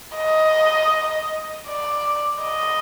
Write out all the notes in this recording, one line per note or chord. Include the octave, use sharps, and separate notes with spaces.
D#5
D5
D#5